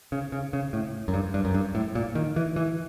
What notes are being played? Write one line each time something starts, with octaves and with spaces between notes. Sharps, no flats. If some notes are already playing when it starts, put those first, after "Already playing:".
C#3
C#3
C#3
A2
F#2
G2
G2
F#2
G2
A2
A#2
D#3
E3
E3